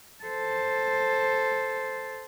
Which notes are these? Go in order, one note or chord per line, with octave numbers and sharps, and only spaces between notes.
A4 C5